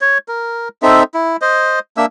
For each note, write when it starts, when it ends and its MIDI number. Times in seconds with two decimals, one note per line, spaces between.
0.01 0.18 73
0.28 0.68 70
0.82 1.03 60
0.82 1.03 63
0.82 1.03 69
0.82 1.03 76
1.14 1.37 64
1.42 1.79 72
1.42 1.79 75
1.97 2.06 58
1.97 2.06 62
1.97 2.06 76
1.97 2.06 88